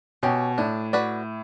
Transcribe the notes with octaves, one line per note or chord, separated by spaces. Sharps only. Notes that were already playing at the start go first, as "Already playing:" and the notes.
B2 C#4 G4
A2 D4
F#4 B4 D5